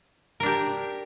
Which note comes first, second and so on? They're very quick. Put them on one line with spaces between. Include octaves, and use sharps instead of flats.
A#4 D4 G4